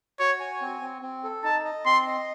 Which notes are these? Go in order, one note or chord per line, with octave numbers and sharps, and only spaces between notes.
F#4 C#5
G#5
C4
C4
C4
A4
D#4 A5
D#5
C4 C6
D#5